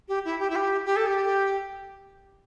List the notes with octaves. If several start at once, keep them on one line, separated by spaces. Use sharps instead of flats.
G4
E4
G4
E4
G4
G4
A4
G4